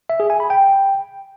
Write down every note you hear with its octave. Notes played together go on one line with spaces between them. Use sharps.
E5
G#4
G#5
B5
G5